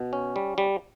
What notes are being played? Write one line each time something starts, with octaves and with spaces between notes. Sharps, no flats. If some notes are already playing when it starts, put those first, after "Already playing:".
Already playing: B2
C#4
G3
G3